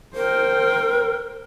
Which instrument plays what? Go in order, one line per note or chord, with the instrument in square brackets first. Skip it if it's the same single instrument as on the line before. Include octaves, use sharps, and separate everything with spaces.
[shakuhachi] A#4 [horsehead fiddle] C5 G5